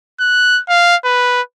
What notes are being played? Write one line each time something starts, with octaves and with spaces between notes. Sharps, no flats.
F#6
F5
B4